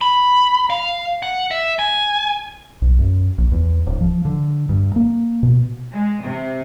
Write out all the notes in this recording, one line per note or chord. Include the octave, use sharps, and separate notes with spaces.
B5
F5
F#5
E5
G#5
B1
F#2
A#1
E2
D1
F3
D3
G2
A#3
B2
G#3
C3